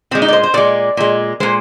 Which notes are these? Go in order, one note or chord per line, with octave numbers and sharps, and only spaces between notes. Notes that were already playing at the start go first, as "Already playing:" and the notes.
A#2 G#3 C4
D#4
D5
C5
C5
A#2 G#3 D5
A#2 G#3
A#2 G#3 C5